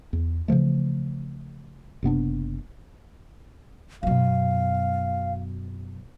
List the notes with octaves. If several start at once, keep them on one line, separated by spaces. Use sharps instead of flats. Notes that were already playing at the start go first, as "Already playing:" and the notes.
E2
C#3 E3 F3 A3
F#1 C3 B3 D4
F#2 B2 F5